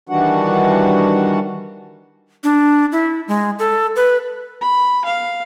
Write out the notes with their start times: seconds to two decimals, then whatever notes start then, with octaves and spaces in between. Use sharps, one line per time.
0.09 D#3 E3 G3 D4 F#4 F#5
2.44 D4
2.92 E4
3.28 G#3
3.59 A4
3.96 B4
4.61 B5
5.05 F5